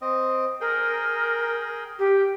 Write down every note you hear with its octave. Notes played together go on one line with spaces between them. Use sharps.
C4 D#5
G#4 A#4 G5
G4